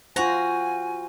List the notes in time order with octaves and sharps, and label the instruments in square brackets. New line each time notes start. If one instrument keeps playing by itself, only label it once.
[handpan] F4 C5 [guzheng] F#4 A#5 [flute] G#5